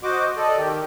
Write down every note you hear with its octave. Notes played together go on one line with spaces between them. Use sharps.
F#4 C5 D#5 D6
A4 D5 D#5
D#3 G4